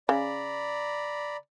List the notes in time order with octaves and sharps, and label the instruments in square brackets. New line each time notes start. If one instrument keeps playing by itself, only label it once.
[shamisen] C#3 [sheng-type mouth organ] D5 A#5 B5